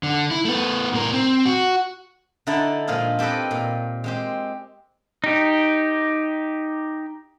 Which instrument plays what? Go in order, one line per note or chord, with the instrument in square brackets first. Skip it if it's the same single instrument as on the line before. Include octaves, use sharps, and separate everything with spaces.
[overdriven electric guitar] D3
E4
A3 B3
A2 A#4
C4
F#4
[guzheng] D3 D#4 E4 A4 D5
A#2 F3 G#3 F4 G#4
C4 G4 A4 B4 D#5
A#2
G#3 C4 G4
[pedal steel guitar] D#4 G4